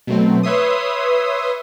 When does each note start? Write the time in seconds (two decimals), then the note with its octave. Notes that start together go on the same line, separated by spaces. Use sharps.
0.07 B2 F#3 A3 C4
0.43 B4 C#5 E5 C6 D#6